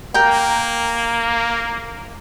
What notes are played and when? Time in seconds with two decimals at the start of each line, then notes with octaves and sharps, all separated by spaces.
0.14 A#3 A#4 G5